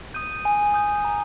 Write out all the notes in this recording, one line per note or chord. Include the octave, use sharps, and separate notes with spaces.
D#6 G6 D#7
G#5
D#6 G6
A#5